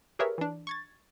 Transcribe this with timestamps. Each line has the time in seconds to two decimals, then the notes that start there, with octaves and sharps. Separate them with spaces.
0.19 G4 G#4 A#4 B4 C#5 E5
0.38 E3 D4
0.67 C#6 G#6 A6